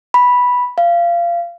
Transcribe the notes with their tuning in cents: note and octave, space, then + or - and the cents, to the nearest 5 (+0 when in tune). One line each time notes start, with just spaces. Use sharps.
B5 -5
F5 -20